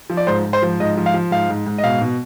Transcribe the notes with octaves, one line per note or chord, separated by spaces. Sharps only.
F3
D5
G#2 C5
G#2
C5
F3
G#2 D#5
F3
F5
F3
G#2 F5
G#2
G#2
D#5
B2 F5
B2